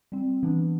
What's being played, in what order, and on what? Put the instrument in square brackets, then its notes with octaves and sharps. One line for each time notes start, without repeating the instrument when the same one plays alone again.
[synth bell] G3 C4
E3 B3 D4